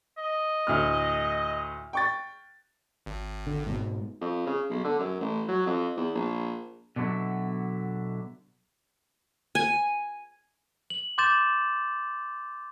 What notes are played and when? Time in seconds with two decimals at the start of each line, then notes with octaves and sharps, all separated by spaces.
0.18 D#5
0.67 D2 A2 F6
1.93 G5 C#6 A6
3.06 G#1
3.47 D3
3.66 G#2 B2
4.21 F2
4.46 C#3
4.70 B1
4.84 D3
4.99 F#2
5.20 A1
5.48 F#3
5.66 F2
5.97 E2
6.15 A#1
6.96 B2 D3 F#3 D4 E4
9.55 G#5
10.90 F#7
11.18 C6 D6 G6 A6 E7